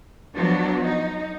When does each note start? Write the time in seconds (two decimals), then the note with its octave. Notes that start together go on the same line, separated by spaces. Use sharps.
0.35 F3 F#3 B3 D4 F#4
0.85 D#4